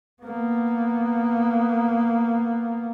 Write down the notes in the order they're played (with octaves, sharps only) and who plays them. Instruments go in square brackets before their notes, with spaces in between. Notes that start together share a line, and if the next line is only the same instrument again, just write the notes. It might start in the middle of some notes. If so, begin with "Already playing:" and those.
[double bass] A#3 B3